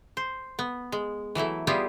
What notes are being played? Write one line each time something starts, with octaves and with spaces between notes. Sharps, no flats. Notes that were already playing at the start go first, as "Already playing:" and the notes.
C5
B3
G#3
E3 F#3 A3 E4
G3 B3 E4 F4 G4 G#4